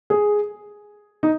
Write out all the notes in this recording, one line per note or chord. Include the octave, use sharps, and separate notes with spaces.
G#4
D#4